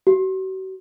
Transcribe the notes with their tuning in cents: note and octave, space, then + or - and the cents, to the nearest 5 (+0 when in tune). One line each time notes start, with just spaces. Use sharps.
F#4 +40